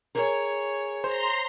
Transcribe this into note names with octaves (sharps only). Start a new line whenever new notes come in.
G#4 A#4 C#5
C5 A#5 C6